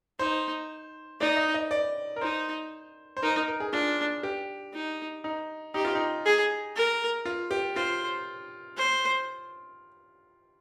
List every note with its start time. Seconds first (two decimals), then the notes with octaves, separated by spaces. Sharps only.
0.19 D#4 C5
1.20 D#4 D5
1.37 D#5
1.54 D#5
1.71 D5
2.16 A#4
2.21 D#4 C5
3.17 C5
3.23 D#4 A#4
3.35 A#4
3.48 A#4
3.60 G#4
3.72 D4 F4
4.23 G4
4.74 D#4
5.24 D#4
5.74 D#4 G4
5.85 F4
5.95 D#4
6.25 G#4
6.76 A#4
7.26 F4
7.51 G4
7.76 F4 C5
8.77 C5